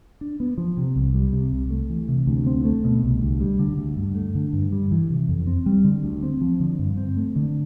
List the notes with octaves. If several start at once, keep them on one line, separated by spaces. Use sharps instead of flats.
D4
B3
F3
C3
C2
G3
C3
C2
A3
E3
C3
D2
C4
A3
B2
C2
D2
G3
D3
D2
G2
A3
D3
G2
G3
E3
C3
F2
C4
G3
D3
D2
C4
F3
D3
G2
C4
A3
D3